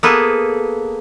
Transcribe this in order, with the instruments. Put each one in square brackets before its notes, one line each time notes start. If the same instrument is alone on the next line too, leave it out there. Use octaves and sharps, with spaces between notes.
[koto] A#3 B3 G#4 A4 B4